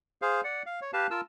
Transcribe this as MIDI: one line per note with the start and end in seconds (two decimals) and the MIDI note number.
0.22 0.41 68
0.22 0.41 72
0.22 0.41 77
0.44 0.63 74
0.44 0.63 78
0.66 0.80 77
0.81 0.91 73
0.93 1.07 67
0.93 1.07 71
0.93 1.07 77
0.93 1.07 81
1.11 1.21 65
1.11 1.21 70
1.11 1.21 81
1.11 1.21 88